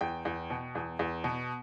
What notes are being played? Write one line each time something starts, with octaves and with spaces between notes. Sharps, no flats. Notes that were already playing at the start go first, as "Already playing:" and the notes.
E2 G5
E2
B2
E2
E2
B2